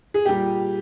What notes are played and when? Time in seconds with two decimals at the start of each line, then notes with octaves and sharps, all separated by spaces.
0.14 G#4
0.25 A#2 G3 G4